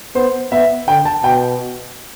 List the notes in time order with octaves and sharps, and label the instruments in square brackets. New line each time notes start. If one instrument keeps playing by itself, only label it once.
[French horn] B3 [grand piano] C5
[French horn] B3 [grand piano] E5
[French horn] D3 [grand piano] G5
[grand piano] A5
[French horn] B2 [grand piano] G5